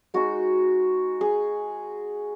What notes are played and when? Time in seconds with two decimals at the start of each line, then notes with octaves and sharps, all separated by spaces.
0.14 G#3 D#4 F#4
1.21 G#4